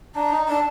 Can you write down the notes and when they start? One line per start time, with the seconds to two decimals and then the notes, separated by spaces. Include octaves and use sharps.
0.15 D4 A#5
0.32 D#4
0.48 D4 A5